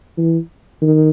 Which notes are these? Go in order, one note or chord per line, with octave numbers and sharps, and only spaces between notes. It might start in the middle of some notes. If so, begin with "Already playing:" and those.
E3
D#3